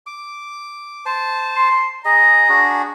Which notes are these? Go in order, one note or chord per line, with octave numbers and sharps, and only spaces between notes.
D6
C5 A5
C6
G#4 D#5 A#5
D4 F#4 G#4